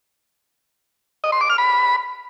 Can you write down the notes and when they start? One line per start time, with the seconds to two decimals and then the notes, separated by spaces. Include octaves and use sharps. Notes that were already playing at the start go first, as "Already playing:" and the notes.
1.24 D#5
1.32 C6
1.41 D6
1.50 F6
1.58 B5